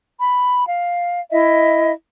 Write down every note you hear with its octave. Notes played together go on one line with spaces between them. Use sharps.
B5
F5
E4 D#5 E5